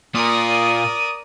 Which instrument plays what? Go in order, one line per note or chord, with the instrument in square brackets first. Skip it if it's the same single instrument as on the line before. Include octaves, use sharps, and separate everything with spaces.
[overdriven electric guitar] A#2 F4 [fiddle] A#4 D5 [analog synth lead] D#6